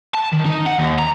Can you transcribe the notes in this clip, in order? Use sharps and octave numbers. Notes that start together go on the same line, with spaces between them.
A5
D#3
D#4
F#5
D#2
A#5